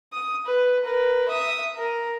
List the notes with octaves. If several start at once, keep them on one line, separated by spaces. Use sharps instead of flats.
D#6
B4
A#4 B4
E5 D#6
A#4